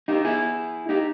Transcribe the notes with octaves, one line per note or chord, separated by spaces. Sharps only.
D#4 G4
E4 G#4
D#4 G4